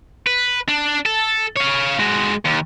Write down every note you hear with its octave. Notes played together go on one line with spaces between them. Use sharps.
B4
D4
A4
C#5 F5
G#3 F#4
D#2